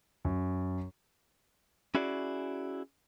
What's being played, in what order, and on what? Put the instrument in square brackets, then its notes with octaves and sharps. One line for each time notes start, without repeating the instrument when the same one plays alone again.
[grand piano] F#2
[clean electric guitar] C#4 E4 F#4 G#4 D5